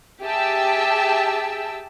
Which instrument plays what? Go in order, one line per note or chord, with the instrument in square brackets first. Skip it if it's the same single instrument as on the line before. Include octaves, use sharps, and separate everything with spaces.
[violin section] G4 G#4 E5 G5 A5 E6